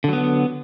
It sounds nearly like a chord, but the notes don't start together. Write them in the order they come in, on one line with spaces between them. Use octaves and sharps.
D3 F#3 B3